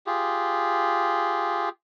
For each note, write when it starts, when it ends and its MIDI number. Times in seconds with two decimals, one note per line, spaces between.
0.07 1.69 65
0.07 1.69 67
0.07 1.69 68